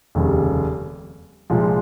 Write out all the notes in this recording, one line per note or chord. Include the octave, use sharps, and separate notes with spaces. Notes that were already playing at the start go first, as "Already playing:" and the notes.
F1 D#2 C#3 G3
C2 A#2 F3 G#3